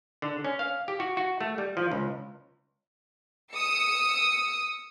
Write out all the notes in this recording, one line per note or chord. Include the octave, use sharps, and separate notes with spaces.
D3
C#4
F5
G4
F#4
F#4
A3
G3
F3
C#2
D#6 E6 C#7